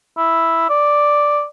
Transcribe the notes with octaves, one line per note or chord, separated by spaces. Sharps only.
E4
D5